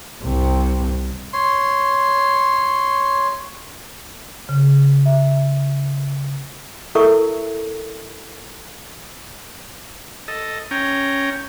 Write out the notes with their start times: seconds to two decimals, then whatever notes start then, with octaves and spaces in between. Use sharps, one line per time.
0.23 C2 C3
1.33 C#5 C6
4.49 C#3
5.06 E5
6.95 E4 A4 A#4 E5 C#6 D#6
10.28 A4 D#5
10.71 C#4 G5 A#5